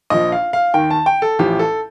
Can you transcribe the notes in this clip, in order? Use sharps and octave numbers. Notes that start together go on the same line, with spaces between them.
A#1 A#2 F3 D#5
F5
F5
D#2 D#3 G5
A5
G5
A4
A1 A2 F3 G4
A4